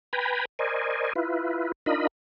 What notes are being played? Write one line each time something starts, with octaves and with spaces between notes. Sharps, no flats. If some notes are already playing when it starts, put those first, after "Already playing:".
B4 G5 G#5 A#5 B5
A#4 C5 D5 D#5 G#5
E4 F4 B4
D4 D#4 F4 A#4 D#5 B5